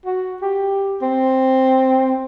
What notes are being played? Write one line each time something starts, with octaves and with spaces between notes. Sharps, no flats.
F#4
G4
C4